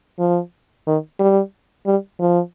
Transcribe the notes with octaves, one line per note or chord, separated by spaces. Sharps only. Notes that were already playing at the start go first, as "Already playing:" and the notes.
F3
D#3
G3
G3
F3